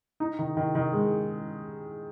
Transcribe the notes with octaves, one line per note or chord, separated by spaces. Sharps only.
D#4
D#3
D#3
D#3
G#3